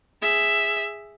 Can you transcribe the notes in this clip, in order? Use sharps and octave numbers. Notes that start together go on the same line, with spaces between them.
G#4 E5